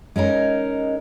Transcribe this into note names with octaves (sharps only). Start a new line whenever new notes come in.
G#3 C#4 D#4 A#4